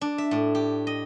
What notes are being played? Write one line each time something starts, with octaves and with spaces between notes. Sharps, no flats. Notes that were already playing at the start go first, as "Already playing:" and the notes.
D4
E5
A2
G4
D#5